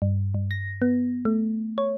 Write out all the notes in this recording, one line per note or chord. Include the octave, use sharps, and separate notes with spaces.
G2
G2
A#6
B3
A3
C#5